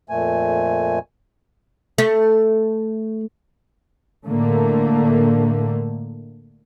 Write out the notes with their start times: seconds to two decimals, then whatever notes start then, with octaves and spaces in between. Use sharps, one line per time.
0.10 F2 A#2 A3 G#5
1.98 A3
4.27 A2 D3 A3 A#3